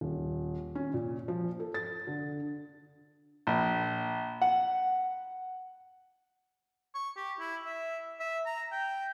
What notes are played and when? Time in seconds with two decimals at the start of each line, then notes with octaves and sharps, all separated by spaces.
0.01 D#1
0.75 C#4
0.94 A#2
1.28 F3
1.60 A4
1.74 A6
2.07 D3
3.47 A#1
4.42 F#5
6.95 C#6
7.16 G4
7.39 E4
7.65 E5
8.19 E5
8.46 A#5
8.72 G5